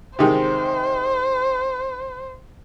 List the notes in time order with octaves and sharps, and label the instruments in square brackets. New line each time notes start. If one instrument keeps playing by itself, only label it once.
[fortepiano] C3 D#3 G#3 [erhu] C5